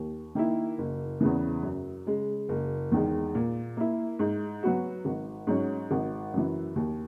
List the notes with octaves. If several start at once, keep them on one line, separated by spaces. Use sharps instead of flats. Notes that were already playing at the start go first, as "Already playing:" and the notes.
Already playing: D#2
D#3 A#3 E4
F#1
E2 C#3 E3
F#2
C#3 G#3
F#1
E2 D#3 G#3
A#2
A#3 E4
G#2
F#3 B3 F#4
G#1
G#2 F#3 C#4
G#1
F#2 E3
D#2